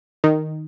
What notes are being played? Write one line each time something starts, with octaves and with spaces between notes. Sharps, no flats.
D#3